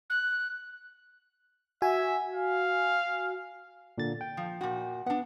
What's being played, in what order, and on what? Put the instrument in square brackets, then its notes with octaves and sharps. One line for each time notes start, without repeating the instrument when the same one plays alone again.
[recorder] F#6
[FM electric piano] F#4 G#5 [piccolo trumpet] E5
[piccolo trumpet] F5
[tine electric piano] A#2 D3 A6
G5
[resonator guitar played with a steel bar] F3
A#2 F#4
[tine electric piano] B3 [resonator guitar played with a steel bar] D4 F#5